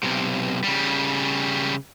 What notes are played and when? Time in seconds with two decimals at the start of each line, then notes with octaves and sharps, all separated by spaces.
0.03 B1 C3
0.64 C#3 G3